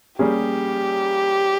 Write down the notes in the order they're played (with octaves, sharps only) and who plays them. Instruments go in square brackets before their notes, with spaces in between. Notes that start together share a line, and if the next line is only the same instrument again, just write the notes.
[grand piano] G3 A#3 C#4 G#4 [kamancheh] G4